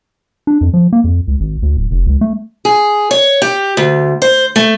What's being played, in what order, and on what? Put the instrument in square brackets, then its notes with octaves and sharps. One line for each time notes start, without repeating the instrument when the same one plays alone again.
[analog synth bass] D4
F2
F3
A#3
F2
C#2
G#1
D2
D1
F1
C#2
A3
[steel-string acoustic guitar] G#4
C#5
G4
D2
C5
A3